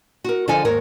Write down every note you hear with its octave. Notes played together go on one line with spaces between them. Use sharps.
F#4 A#4
D3 F3 F4 A4 D#5 G#5
D#2 G#2 A#4 C#5